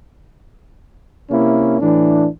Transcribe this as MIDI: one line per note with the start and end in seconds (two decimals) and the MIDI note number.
1.30 1.80 48
1.30 1.80 58
1.30 1.80 61
1.30 1.80 64
1.80 2.27 45
1.80 2.27 52
1.80 2.27 62